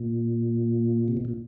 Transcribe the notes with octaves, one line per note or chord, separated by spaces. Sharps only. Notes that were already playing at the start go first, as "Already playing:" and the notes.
Already playing: A#2
C3
B2
A#2